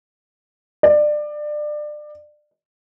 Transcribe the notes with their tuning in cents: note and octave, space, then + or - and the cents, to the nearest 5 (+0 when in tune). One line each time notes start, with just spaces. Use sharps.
D5 +25